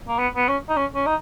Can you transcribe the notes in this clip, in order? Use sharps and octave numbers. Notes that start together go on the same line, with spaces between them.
A#3
B3
B3
C#4
D#4
C#4
C#4
D#4